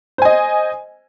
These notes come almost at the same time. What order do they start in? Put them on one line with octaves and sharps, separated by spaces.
C5 G#5 D#5